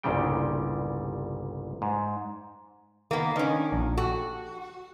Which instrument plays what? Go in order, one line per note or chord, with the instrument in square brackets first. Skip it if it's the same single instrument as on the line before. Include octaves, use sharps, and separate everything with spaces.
[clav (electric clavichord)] G1 C2 A#2 C#3 G3 G5
G#2
[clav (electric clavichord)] D#3 [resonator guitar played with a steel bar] A#3 B3
[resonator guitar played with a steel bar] D#3 C#4 [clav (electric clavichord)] D4
[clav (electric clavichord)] A#1 D4 A#5
[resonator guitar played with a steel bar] F#4 [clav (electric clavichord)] G4 A4